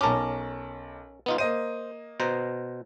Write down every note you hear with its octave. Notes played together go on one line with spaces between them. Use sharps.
B1 C#4 A#4 A5 D6
B3 D#4 F4
A#3 C5 D#5 D#7
B2 C5 A#5